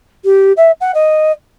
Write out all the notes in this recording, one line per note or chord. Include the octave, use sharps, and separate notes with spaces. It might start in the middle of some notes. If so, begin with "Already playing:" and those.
G4
E5
F#5
D#5